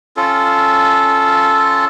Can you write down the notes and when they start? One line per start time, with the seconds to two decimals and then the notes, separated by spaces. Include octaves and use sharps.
0.17 C#4 F4 A4